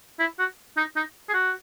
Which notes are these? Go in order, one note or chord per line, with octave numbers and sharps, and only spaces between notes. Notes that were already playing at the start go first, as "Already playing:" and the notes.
E4
F#4
D#4
D#4
G#4
F#4